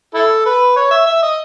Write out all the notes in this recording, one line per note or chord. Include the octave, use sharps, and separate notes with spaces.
E4 A4
B4
C#5
E5
E5
D#5